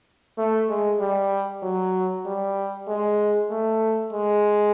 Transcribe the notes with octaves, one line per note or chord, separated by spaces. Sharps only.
A3
G#3
G3
F#3
G3
G#3
A3
G#3